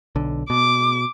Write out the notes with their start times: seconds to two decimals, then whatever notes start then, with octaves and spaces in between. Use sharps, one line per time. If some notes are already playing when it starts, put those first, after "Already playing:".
0.15 B1 D3
0.50 B2 D6